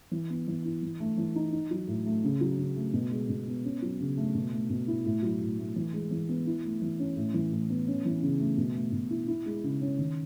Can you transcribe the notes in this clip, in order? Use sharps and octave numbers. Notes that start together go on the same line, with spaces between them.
E3
B3
E3
E4
E3
A3
E3
D#4
D#4
F#3
A2
A3
C#3
F#3
C#3
A3
B2
G#3
B2
B3
C#4
F#3
C#3
A3
B2
A3
B2
E4
A2
F#3
A2
A3
E3
G#3
E3
B3
E4
A3
E3
C#4
A2
E3
A2
B3
C#4
E3
C#3
A3
B2
A3
B2
E4
E4
G#3
C#3
C#4
D#3